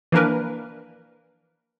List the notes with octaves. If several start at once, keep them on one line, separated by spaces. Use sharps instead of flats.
E3 F3 A#3 D4 A#4 B4